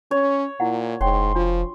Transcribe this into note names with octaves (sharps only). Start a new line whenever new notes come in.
C#4 C#5
A#2 E4 F#5
F1 G#2 C#5 G5 C6
F3 D4 F4 F#4